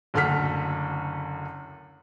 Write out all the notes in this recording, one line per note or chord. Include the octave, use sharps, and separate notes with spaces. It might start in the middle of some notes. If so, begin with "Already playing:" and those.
F#1 D2 A4 F#5 F6 B6